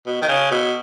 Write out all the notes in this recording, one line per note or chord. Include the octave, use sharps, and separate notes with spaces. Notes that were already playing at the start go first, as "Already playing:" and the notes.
B2
D#3
C#3
B2